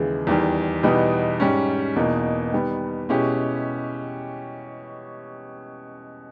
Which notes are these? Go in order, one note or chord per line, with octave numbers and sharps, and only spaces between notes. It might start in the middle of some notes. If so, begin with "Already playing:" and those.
Already playing: D#2 C#3 E3 G#3
E2 D#3 G3
E2 B2 G3 B3 D#4
G#2 G3 C#4
E2 B2 A#3 D#4
D#3 G3 B3
B2 G#3 C#4 E4 G4